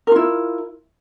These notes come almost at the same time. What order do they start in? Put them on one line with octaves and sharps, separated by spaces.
A#4 F4 E4